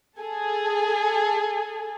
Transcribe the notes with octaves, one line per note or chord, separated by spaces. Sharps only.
G#4 A4